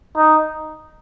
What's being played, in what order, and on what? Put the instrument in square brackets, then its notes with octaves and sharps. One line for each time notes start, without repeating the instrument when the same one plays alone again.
[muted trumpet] D#4